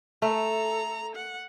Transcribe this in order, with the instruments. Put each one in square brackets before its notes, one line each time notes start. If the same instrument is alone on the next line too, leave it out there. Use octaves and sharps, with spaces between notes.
[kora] A3 [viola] A4 A#5
[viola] F#5